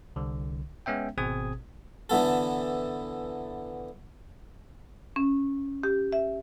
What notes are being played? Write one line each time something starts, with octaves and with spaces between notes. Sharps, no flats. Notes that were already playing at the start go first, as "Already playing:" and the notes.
C2 D3
G#3 B3 C#4 E5 G5
G#1 B2 C4 G#4 D#6 G#6
D3 E3 B3 A4
C#4
G4
E5